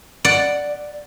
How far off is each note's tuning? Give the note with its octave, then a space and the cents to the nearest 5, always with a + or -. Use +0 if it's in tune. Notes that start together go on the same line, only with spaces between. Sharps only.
D5 +0 F#5 +0